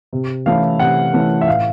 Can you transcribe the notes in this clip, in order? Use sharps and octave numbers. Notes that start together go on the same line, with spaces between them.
C3
E3 A3 C#4 E4 F5
C3 F#5
E3 A3 C#4 E4
E5
A2 F5